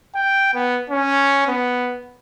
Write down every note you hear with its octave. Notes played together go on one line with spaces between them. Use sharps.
G5
B3
C#4
B3